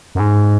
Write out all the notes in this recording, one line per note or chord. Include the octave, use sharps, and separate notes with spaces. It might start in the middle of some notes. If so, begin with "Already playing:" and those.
F#2
G#2